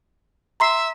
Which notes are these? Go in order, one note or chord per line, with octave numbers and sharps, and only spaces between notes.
E5 A#5 C6 C7